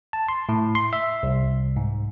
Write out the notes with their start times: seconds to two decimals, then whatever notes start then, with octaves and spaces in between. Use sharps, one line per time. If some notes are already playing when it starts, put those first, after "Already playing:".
0.13 A5
0.29 C6
0.49 A2
0.75 C6
0.93 E5
1.23 C2
1.76 G#2